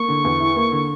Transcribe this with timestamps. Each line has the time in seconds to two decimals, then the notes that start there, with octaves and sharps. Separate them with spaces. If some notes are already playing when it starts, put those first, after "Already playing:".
Already playing: A#3 C#6
0.08 D3
0.24 E2
0.40 E4
0.56 A#3
0.72 D3